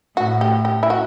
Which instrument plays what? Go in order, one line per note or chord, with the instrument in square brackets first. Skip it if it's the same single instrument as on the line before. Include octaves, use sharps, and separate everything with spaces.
[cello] A2 [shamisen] F#4
[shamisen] G4
G4
E4
F#4